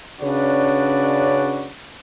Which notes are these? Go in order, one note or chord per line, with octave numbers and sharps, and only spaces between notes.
C#3 C#4 D4 F#4 B4 D5